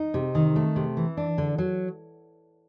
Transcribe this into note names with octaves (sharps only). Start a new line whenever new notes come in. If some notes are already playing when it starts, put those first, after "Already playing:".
Already playing: D#4
C3
D#3
A3
C3
E3
D4
D3
F#3